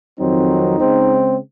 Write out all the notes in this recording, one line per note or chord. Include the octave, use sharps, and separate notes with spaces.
F2 D#3 F#3 C4 D#4
C#3 G#3 C4